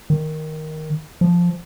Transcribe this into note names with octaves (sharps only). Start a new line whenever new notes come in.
D#3
F3